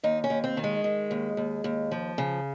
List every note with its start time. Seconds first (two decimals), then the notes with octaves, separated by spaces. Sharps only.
0.03 D#2 D#4
0.24 C#4
0.30 D#2
0.44 C4
0.57 D#3
0.64 G#3
0.84 D#3
1.11 D#2
1.37 D#2
1.64 D#2
1.91 F3
2.18 C#3